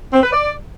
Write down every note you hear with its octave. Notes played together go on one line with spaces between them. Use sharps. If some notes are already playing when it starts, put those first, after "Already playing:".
C4
B4
D5